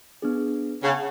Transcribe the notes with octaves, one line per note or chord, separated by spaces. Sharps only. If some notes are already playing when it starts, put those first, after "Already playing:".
B3 D4 G#4
C#3 G#4 C#5 F#5 A5